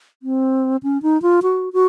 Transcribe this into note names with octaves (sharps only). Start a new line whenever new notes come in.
C4
C#4
D#4
F4
F#4
F#4